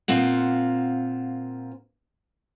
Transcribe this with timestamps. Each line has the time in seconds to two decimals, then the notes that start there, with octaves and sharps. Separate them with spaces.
0.08 A#2 C4 F4 F#5